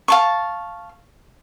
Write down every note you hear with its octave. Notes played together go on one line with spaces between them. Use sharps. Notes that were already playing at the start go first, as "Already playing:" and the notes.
F5 A5 C#6